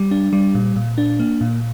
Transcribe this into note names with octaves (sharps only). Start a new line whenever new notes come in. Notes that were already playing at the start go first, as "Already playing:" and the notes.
Already playing: G3
D4
G3
A#2
A#2
D4
A#3
A#2